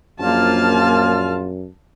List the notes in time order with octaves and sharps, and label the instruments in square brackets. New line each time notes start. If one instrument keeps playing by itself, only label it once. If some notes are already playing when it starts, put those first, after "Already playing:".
[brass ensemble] A#1 F4 [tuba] F#2 [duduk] A#3 [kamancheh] A5 F6